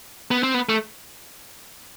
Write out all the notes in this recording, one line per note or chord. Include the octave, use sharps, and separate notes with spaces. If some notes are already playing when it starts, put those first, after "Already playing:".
B3
C4
B3
A3